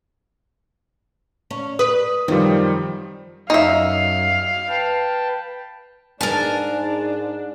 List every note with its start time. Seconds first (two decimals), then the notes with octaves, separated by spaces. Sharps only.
1.51 C#4
1.79 B4 D#6
2.28 F#2 D#3 F3 G3 C4
3.50 F#2 F#3 D#4 E5 F5
4.68 B4 G5 A5
6.21 G#2 D4 A#4 G#5 A5